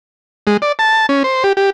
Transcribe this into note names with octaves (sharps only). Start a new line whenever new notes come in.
G#3
D5
A5
C#4
C5
G4
G4